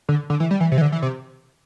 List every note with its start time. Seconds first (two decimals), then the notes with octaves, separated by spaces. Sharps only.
0.09 D3
0.30 D3
0.40 E3
0.51 G3
0.60 E3
0.72 C3
0.78 E3
0.81 D3
0.92 E3
1.02 C3